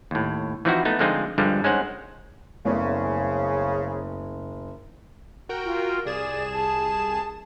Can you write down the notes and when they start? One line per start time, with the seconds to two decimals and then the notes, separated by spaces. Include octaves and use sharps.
0.11 D#2 A2
0.65 E3 F3 C4 D#4 E4 F#4
0.85 A3 B3 D#4
0.99 D3 F3 G#3 C4 D#4 F4
1.38 G2 D3 F3 G3 G#3
1.64 G#3 C#4 D#4 C5 F#5
2.65 F#1 C#3 A3 B3 D5
5.49 F#4 A#4 G5
5.65 F4
6.05 C2 G#4 D5 E7
6.54 A5